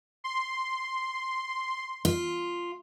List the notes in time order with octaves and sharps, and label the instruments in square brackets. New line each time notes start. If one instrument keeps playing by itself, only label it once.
[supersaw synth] C6
[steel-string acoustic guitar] F4